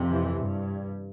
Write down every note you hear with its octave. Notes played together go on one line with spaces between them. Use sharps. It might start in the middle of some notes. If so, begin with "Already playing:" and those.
Already playing: F2 C3
E3
G2